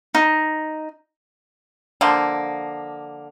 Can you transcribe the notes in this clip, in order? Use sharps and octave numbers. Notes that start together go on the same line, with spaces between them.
D#4
D3 F3 A#3